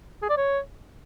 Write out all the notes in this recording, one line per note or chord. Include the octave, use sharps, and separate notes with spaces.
G#4
D5
C#5